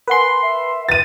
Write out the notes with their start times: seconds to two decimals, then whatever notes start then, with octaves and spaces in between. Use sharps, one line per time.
0.08 A#4 B4 F#5 G#5 C6
0.43 E5
0.89 B4 A6 D#7